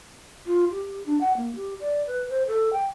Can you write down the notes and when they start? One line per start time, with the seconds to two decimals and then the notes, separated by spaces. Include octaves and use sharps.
0.47 F4
0.71 G4
1.06 D4
1.21 F#5
1.37 A#3
1.55 G4
1.80 D5
2.07 B4
2.29 C5
2.47 A4
2.73 G5